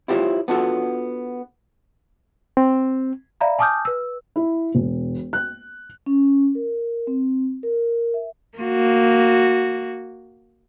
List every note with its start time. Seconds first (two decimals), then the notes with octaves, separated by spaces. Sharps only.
0.08 E4 F4 G4 A4 C5 C#5
0.48 B3 D4 F4 F#4 A4
2.57 C4
3.41 D5 E5 F5 A#5 B5
3.58 G#5 A5 D6 D#6 F6 G6
3.85 B4 E6
4.36 E4
4.75 E1
5.33 F#6
6.06 C#4
6.55 A#4
7.07 C4
7.63 A#4
8.14 E5
8.58 A#3 F#4